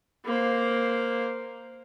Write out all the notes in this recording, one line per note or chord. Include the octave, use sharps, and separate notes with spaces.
A#3 C5